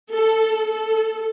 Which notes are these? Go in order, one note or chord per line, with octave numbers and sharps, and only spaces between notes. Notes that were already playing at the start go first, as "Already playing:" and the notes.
A4
A4